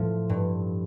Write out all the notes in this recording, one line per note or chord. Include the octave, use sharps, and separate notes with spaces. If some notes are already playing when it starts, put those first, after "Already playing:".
Already playing: A2 F3
G2